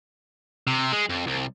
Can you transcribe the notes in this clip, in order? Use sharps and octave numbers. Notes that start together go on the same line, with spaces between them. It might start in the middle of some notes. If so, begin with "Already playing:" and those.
C3
G#3
F2
C2